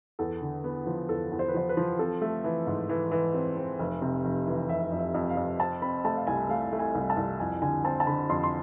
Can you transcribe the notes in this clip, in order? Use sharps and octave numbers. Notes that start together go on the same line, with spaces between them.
E2 A4
D3
B3
F3
E2 A4
E2
C5
B4
F3 C5
B4
F3
C4 A4
A3
E3
G#2
E3
E3
C4
C4
F1
C3
F1
E3
F1 E5
F2
E5
F2
F5
F2
C4 A5
C4 B5
A3 A5
F5
C2 G#5
A3 F5
A3
G#5
C2
A5
C2
F2 G#5
D3 G#5
C4 A5
A5
D3 B5
F2 C6
C6